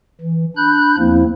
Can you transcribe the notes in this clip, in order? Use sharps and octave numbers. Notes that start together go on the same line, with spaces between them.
E3
D4 B5 F#6 G6
E2 F3 A#3 C4 E4